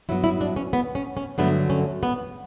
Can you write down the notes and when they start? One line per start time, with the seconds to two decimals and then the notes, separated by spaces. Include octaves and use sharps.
0.09 G2 F#3 B3 E4
0.24 E4
0.41 D4
0.56 C#4
0.73 B3
0.95 C#4
1.17 C#4
1.38 G2 D3 F#3 A3 B3
1.70 C#4
2.03 B3